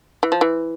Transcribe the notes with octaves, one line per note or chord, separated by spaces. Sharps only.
E3
F3
E3